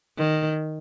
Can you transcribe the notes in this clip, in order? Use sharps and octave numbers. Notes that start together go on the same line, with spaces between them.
D#3